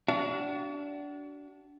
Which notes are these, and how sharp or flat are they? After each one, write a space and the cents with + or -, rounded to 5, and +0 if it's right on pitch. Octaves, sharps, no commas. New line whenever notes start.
D4 -20 F#4 +35 F5 -40